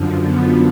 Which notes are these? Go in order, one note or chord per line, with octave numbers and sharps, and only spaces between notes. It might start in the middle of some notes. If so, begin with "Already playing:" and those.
Already playing: F#2 D3 F3
B3